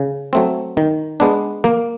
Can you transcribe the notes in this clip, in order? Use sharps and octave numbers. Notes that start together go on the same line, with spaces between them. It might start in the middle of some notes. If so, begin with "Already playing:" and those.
Already playing: C#3
F#3 A3 C4
D#3
G#3 B3 D4
A#3